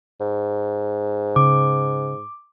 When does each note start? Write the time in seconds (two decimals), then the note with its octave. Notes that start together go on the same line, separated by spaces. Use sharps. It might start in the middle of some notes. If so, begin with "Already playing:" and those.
0.21 G#2
1.36 C#3 D6